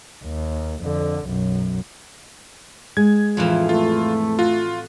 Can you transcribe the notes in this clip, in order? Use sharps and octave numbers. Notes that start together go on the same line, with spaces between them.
D#2
F2 D3
B1 F#2
G#3 G#6
F2 A2 E3 F4
A3 F4
F4 F#4